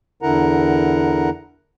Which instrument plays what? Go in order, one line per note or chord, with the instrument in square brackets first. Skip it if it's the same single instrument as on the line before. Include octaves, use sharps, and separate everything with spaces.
[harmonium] E2 D3 E4 A#4 F#5 A#5